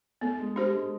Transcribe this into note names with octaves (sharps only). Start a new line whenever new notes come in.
A3 B3
G#3
A3 D4 G4 C5
G#3